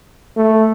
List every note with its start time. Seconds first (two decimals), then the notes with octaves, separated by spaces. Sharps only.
0.37 A3